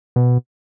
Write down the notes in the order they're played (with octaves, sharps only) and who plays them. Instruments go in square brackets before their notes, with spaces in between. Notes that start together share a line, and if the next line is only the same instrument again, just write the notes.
[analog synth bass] B2